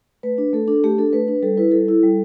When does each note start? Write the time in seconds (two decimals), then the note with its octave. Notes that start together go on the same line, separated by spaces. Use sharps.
0.23 A3 B4
0.38 D4
0.53 A3 A4
0.68 D4 A4
0.84 A3 G4
0.98 D4 A4
1.13 A3 B4
1.28 D4 B4
1.43 G3 A4
1.57 E4 B4
1.71 G3 A4
1.89 E4
2.03 G3